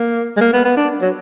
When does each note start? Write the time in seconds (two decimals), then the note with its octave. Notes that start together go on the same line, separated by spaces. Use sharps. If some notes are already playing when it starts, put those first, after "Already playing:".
Already playing: A#3
0.37 G#3
0.41 A#3
0.53 B3
0.65 B3
0.77 D4
1.02 F#3